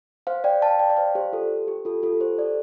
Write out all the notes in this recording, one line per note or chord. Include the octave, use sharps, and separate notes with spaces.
C5 F5
D5 G5
F5 A5
D5 G5
D5
C5 F5
G4 C5
F4 A4
G4
F4 A4
F4 A4
G4 C5
A4 D5